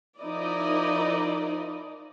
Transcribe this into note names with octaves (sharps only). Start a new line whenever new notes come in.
F3 D#4 E4 A#4 D5 D#5